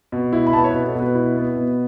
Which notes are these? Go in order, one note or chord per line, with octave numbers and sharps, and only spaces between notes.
B2
E4
B5
B3 A5
C#5
B2 B4
A4
B2 B4
E4
B3
B2